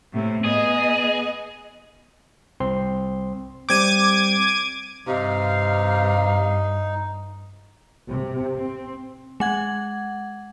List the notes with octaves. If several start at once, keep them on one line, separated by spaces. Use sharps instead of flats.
A2 C3
B3 G#4 D#5
C2 C4 C6
G3 C4 D6 G6 G#6 D#7
G2 C3 D#4 F5
C3
C4
G#3 F#5 G#6